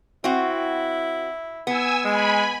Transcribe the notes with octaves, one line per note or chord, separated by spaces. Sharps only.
C4 E4 F#4
B3 G#5 E6
G#3 G#5 B5